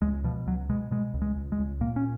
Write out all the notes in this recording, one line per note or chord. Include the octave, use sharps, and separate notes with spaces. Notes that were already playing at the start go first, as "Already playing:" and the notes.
C#2 G#3
B2 F3
C#2 F#3
B2 G#3
B2 G#3
C#2
G#3
C#2
G#3
C#2
A#2 A#3
C#4